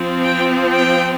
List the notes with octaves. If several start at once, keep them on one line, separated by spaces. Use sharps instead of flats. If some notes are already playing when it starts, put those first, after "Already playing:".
Already playing: F3 C4
G5
G5